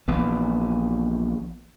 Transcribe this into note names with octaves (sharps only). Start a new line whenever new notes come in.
A#1 E3 B3